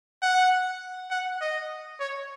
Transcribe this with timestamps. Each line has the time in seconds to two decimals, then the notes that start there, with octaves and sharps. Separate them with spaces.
0.22 F#5
1.10 F#5
1.41 D#5
2.00 C#5